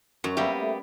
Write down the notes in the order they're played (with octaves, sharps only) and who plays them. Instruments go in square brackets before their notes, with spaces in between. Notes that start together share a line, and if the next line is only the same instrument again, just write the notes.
[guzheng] F#2 [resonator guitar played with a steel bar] F#3
[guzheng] G3 [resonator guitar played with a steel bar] A#3 B3 G4 [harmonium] E5
[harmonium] A3